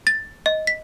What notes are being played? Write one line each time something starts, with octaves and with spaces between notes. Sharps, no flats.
A6
D#5
B6